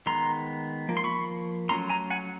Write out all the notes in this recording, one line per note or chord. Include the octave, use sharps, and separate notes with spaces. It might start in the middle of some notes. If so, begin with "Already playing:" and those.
D#3 G#3 B3 A#5 C6
F3 A#3
C6
B5 C#6
F#3 A3 C#4 A#5 C6
G#5 A#5
F#5 G#5